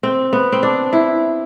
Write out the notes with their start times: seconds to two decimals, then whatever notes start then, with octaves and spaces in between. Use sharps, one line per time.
0.03 C4
0.33 B3
0.52 C4
0.63 D4
0.93 E4